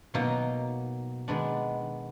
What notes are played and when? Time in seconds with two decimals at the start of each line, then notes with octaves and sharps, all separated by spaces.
0.14 B2 F#3 A#3 D#4
1.28 D#3 G#3 B3 D4